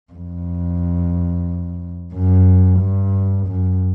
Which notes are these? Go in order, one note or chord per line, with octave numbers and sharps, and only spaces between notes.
F2
F#2
G2
F#2